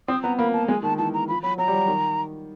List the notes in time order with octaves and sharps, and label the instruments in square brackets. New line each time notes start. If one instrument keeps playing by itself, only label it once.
[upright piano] C4 [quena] D#6
[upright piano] B3 [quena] A#5
[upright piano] A#3 [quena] B5
[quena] A5
[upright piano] G#3 [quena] G#5
[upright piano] D#3 [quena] A5
[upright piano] E3 [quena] A5
[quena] A#5
[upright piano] F3 [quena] B5
[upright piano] F#3 [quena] B5
[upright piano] F#3 [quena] A#5
[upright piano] G3
F#3
D#3